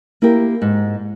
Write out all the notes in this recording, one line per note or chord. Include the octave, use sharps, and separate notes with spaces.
A#3 E4 G4 A#4
G#2